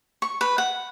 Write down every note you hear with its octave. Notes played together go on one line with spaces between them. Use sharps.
C#6
B4
F#5